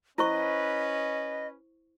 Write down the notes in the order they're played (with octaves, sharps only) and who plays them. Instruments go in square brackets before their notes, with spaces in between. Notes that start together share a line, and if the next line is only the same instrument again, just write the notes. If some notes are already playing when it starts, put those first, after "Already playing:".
[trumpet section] C#4 B4 [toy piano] E4 C5 C#6 [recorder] D#5